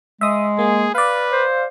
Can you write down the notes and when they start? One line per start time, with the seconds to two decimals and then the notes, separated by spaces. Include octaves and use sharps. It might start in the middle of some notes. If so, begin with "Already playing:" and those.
0.21 G#3 E5 D#6
0.59 A#3 G#4
0.95 B4 D5 F5
1.32 C5